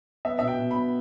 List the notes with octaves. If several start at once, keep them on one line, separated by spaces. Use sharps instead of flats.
B3 E5
B2 E5
G5
B2
B5
B3